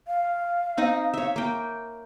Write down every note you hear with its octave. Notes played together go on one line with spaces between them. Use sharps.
F5
C4 D#4 D#5
C#5 E5
A#3 G5